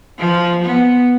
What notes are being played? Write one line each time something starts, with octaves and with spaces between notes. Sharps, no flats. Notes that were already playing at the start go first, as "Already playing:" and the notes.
F3
B3